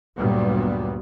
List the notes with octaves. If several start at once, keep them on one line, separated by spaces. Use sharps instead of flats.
D2 G2 A#2 F#3 G3 B3